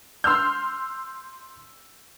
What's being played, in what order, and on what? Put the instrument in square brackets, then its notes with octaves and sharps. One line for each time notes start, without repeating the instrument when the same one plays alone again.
[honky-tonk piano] C6 E6 F6 G6